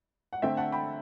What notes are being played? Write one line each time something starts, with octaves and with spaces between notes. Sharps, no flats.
F#5
D3 A3 C4 E5 G5
F#5 A5
G5 B5